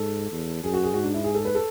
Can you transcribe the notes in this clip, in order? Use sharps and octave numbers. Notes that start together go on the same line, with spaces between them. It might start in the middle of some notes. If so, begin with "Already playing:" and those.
Already playing: G#2 A4
E2
F#2 G#4
F#4
G#4
G#2 F#4
D4
E4
G#4
A4
B4
A4